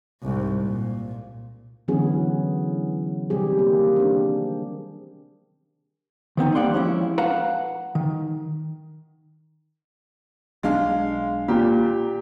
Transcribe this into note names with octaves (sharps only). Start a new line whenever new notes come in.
C2 G#2
A#2
D3 E3 F#3 B3 C#4 G#4
C3 D#3 G3 C4 G4 G#4
A#3
C4 D4
D#3 B3 C4 D#4
G3 A#3 D5 F#5 G5 C6
F3 G#3 C#4 E4
B4 F5 F#5 A5 A#5
D#3
B1 G#3 D4 F5
A#2 G4